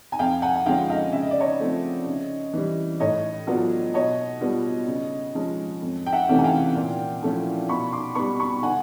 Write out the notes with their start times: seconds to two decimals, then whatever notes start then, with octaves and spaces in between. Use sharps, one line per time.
0.12 G#5
0.19 F2 F5 G5
0.42 F#5 G#5
0.55 F#5
0.66 D3 F3 G#3 C#4 F5 G5
0.90 D#5 F5
1.13 C#3 E5
1.22 D#5
1.31 D5
1.40 C#5 D#5
1.60 F3 A3 C4
2.06 C#3
2.53 E3 G3
3.00 A2 C#5 D#5
3.47 F#3 B3 D4 F4
3.94 B2 C#5 D#5
4.41 G3 B3 D4 F4
4.88 C#3
5.35 F3 G#3 C#4
5.82 F2
6.06 G5
6.12 E5 F#5
6.29 C3 E3 A3 C#4
6.38 G#5
6.44 F5 G5
6.75 A#2
7.23 F3 A3 C#4 E4
7.69 B2 B5 C#6
7.92 C6 D6
8.15 G3 B3 B5 C#6
8.40 B5 C#6
8.62 D3 F#5 G#5